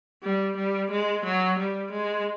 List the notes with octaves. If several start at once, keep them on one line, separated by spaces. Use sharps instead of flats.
G3
G3
G#3
F#3
G3
G#3